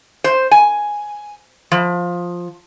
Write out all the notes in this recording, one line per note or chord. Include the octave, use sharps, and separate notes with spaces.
C5
G#5
F3